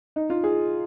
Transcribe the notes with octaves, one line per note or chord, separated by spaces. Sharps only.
D#4
F4
G#4